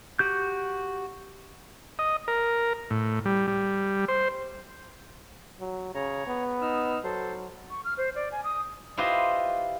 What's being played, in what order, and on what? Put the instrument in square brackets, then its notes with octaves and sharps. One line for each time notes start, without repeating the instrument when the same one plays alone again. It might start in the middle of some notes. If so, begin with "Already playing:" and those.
[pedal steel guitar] F#4 G4 G6
[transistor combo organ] D#5
A#4
A2
G3
G3
C5
[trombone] F#3
[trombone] C#3 [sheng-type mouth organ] C#5 A#5
[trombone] B3
[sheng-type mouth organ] D#4 E6 F6
[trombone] F#3 [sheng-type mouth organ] A4 C5
[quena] C#6
F6
C5
D5
G#5
D#6
[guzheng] E4 F4 G4 B4 C5 D#5